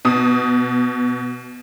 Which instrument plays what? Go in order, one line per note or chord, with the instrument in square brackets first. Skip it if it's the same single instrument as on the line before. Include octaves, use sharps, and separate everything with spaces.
[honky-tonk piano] B2 D#6